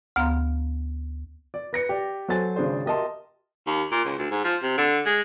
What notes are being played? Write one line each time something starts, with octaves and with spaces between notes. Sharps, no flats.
D2 B3 F5 A#5 C6
D5
B4 A#6 C#7
G4 D5
F#3 A4 C5 G#5 A6
G#1 C#3 D4 G#4 C5
G4 A#4 D#5 E5 A5 C6
D#2
A#2
C#2
D2
G#2
F3
C3
D3
G#3